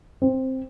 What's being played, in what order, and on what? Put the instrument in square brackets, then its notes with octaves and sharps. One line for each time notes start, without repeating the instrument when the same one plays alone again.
[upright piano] C4